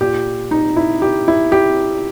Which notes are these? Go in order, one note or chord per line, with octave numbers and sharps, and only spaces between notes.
A#2 G4
D#4
E4
G4
E4
G4